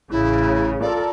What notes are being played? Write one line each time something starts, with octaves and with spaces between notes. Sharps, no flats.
A1 C#3 E4
F4 A4 A#4 D5